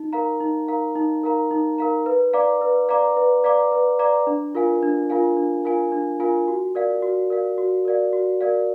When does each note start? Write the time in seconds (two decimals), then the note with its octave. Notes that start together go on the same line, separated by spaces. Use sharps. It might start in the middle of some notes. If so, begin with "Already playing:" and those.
Already playing: D#4
0.13 A#4 F5 A#5
0.40 D#4
0.68 A#4 F5 A#5
0.96 D#4
1.24 A#4 F5 A#5
1.51 D#4
1.78 A#4 F5 A#5
2.06 B4
2.33 D5 F5 A#5 D6
2.61 B4
2.89 D5 F5 A#5 D6
3.17 B4
3.44 D5 F5 A#5 D6
3.72 B4
3.99 D5 F5 A#5 D6
4.27 D4
4.55 F4 A#4 F5 G#5
4.83 D4
5.10 F4 A#4 F5 G#5
5.37 D4
5.64 F4 A#4 F5 G#5
5.92 D4
6.20 F4 A#4 F5 G#5
6.48 F#4
6.75 A#4 D5 F5
7.02 F#4
7.30 A#4 D5 F5
7.58 F#4
7.85 A#4 D5 F5
8.13 F#4
8.41 A#4 D5 F5